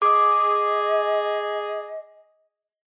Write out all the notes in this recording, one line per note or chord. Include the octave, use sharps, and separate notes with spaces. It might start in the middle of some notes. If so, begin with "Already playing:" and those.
G#4 D#5 D6 D#6